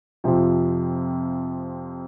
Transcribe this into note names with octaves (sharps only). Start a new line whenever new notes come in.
F2 C3 F3